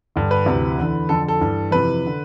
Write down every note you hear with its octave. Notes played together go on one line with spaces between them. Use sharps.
G2 D3
B4
D2 C3 E3
E2 D3
F2 D3 A4
A4
G2 E3
F2 C3 E3 B4
D3